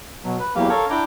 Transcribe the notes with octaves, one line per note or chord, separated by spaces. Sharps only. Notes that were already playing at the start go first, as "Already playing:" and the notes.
B2 F#3
B4
E2 E3 F#3 A#3 G4 F5
A4 A#4 C#5 F5
D4 E4 G5 A#5 D6